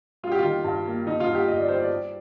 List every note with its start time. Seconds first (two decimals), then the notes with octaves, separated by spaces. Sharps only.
0.23 G3 F4
0.32 G4
0.39 F4
0.44 D#3
0.64 G2
0.86 A#3
1.06 D#3 D#4
1.20 F4
1.27 G2
1.35 G4
1.48 G1 D#5
1.59 D5
1.68 G3 C5
1.80 D5
1.90 G3